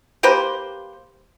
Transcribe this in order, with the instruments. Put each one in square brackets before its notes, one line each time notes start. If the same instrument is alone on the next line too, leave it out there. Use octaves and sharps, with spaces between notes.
[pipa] A#3 G4 B4 C5